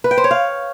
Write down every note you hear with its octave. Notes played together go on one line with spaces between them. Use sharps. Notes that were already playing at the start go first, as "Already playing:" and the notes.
B4
G5
C5
C#5
F5